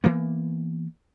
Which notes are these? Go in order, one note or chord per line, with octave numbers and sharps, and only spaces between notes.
E3 A#3 B3